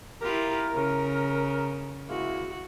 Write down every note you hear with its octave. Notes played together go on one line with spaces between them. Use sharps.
E4 F4 G4 A#4
C#3
G#3 A#3 E4 F#4